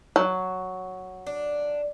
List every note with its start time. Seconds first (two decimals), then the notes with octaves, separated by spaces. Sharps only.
0.16 F#3
1.27 D4